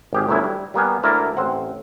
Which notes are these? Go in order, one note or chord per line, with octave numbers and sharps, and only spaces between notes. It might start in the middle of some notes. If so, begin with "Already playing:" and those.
G#1 G4 G#4
G1 D2 F#3 E4 G#5
G3
G3 A#3 B3 G#5
D2 G#3 A#3 E4 A#4 D5
A1 C4 C5 F#5